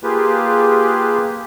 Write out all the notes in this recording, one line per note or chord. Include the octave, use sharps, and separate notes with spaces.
A#3 F4 G4 G#4 B4